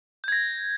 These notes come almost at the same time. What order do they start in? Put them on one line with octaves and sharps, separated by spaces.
G6 G#6 A#6